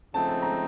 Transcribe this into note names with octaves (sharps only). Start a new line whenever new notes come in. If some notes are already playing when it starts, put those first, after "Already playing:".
C#3 F3 A3 C4 D#4 A5
A5
A#5